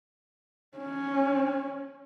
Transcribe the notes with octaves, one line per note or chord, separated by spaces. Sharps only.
C#4